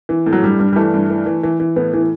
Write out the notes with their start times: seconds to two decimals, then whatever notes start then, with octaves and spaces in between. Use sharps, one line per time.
0.09 E3
0.26 A2
0.33 F#3
0.42 G2 G3
0.59 G2
0.73 G3
0.76 E3 A3
0.94 G2
1.10 E3
1.26 E3
1.43 E3
1.60 E3
1.76 A2 B3
1.94 E3